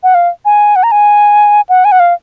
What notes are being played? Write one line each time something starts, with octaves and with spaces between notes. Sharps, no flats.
F#5
F5
G#5
F#5
A#5
G#5
F#5
G#5
F#5
F5